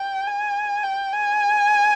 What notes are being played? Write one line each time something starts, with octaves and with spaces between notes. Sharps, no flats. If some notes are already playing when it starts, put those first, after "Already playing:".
Already playing: G5
G#5
G5
G#5